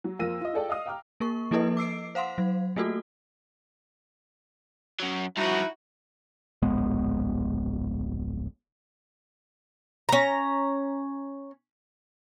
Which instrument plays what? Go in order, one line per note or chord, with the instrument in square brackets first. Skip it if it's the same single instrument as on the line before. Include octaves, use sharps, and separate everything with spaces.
[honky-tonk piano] F#3
F2 A#3 F4 E6 A#6 D#7
F4 D#5
F4 G#4 A4 D5 G5
D#5 F5 D#6
F5 G5 A#5 D6 F6
[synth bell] A#3 A#4 C#6
F3 A#3 E4 A4 B4 D#5
D6 E6 C7 D7
C5 F5 F#5 C6
F#3
A3 A#3 F4 F#4 A4
[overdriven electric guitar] F#2 F#3
[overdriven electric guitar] G2 F3 [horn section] D#4 E4 F#4
[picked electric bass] D1 A#1 G#3 B3
[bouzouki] C#4 A#5